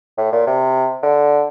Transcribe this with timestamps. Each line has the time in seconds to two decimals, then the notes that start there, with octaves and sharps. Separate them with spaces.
0.18 A2
0.32 A#2
0.47 C3
1.03 D3